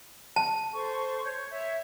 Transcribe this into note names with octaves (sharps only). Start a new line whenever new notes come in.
A5
A4 C5 C#6
C#5 G6
C#5 E5